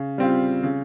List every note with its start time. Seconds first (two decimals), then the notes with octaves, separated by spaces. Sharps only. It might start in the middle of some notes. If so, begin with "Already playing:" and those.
Already playing: C#3
0.18 G3 C4 F4
0.63 C#3